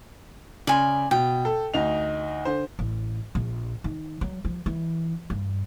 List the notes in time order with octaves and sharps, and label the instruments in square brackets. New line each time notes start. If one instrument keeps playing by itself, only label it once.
[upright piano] C#3 [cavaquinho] D5 G#5 C6
[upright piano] B2 [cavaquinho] G5
[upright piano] A4
D2 D#4 F7
D3 C5
[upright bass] A1
A#1
D#3
F#3
F3
E3
G2